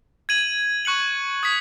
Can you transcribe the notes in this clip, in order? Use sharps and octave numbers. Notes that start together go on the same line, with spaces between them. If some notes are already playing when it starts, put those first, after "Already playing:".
G#6 D#7 F#7
C#6 F#6 C#7 F#7
D#6 G#6 B6